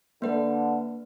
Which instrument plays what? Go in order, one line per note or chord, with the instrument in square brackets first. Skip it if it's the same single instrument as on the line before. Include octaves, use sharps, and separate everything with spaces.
[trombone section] D3 [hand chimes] A#3 B4